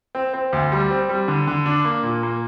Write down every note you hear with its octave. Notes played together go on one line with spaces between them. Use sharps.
C4
C4
D2
G3
C4
G3
D3
D3
D4
A#3
A#2
A#3